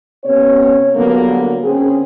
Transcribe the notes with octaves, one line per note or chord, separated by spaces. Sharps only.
C3 B3 C#4 C#5
D3 F#3 G3 A#3 B3
D3 C4 C#4 G#4